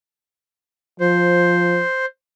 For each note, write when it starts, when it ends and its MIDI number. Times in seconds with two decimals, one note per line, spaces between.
1.00 1.83 53
1.00 2.06 72